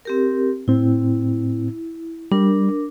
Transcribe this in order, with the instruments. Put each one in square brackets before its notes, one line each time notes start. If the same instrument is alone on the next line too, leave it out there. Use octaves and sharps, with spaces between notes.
[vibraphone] C4 G4 A#4
[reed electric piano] A2 C4 [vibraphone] E4
[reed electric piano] G3 [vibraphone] D4 A#4